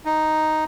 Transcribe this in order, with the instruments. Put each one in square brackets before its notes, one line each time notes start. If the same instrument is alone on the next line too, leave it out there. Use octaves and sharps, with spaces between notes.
[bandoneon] D#4